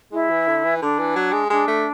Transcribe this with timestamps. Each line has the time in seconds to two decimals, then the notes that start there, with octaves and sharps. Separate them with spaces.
0.12 G#3 E4
0.30 E3
0.48 D3
0.65 E3
0.82 D3 D4
0.99 E3
1.16 F#3
1.33 G#3
1.50 G#3 D4
1.68 A3